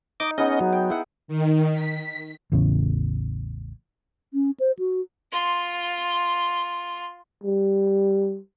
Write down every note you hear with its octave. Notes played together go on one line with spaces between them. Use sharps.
D#4 D#5 D6
B3 C#4 D#4 G#4 D#5
F#3
G5
E4 G#4 F#5
D#3
B6
A1 E2 C#3
C#4
C5
F#4
F4 C6
G3